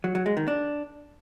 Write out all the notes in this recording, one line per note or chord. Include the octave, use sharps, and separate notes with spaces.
F#3
F#3
G#3
D#3
D4